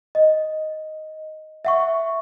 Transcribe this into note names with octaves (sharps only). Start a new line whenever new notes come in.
D#5
E5 F#5 C#6